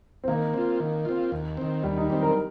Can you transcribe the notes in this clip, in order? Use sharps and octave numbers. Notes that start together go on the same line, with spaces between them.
C4
D#3 A#3
C4 F4
D#3
C4 F4
D#2
D#3 C4
D#2 G3
D#4
D#3 C4 G4
A#4